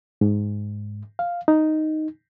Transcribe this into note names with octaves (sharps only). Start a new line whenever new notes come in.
G#2
F5
D#4